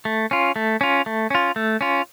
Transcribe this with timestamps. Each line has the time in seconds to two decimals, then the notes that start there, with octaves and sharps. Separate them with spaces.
0.05 A3
0.31 C#4 F4
0.56 A3
0.81 C#4 F4
1.06 A3
1.30 C#4 F4
1.56 A3
1.81 C#4 F4